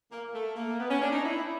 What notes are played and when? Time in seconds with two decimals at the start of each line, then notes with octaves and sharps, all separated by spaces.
0.11 A#3
0.34 A3
0.56 A#3
0.79 B3
0.90 C#4
1.01 D4
1.13 D#4
1.24 E4